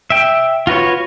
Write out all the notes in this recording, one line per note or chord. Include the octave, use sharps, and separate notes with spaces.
E5 G5
F4 F#4 B4 C#5